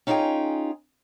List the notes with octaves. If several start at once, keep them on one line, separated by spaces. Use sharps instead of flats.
C#4 D#4 F4 F#4 G#4 G5